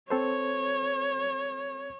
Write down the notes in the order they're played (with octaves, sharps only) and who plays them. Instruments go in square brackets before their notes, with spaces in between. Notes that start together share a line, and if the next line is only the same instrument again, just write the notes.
[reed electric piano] C4 A4 C5 [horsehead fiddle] C#5